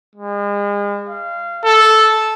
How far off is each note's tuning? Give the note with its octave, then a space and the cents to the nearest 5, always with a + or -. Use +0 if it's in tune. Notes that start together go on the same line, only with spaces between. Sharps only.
G#3 -40
F5 -20
A4 -5